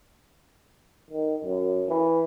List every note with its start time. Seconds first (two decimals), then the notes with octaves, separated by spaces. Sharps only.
1.10 D#3
1.45 F#2
1.89 E3